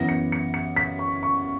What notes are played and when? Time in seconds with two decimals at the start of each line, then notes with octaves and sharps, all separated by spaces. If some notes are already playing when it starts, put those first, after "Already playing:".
Already playing: F#2 E3 B3 A#6
0.09 C#7
0.32 C#7
0.54 C#7
0.76 B6
0.99 C#6
1.23 C#6